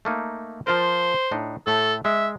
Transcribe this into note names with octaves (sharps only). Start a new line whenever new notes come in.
A3 A#3 D#4
F3 F4 A#4 C5
A2 D4 D#4
A2 A3 A4
G#3 E5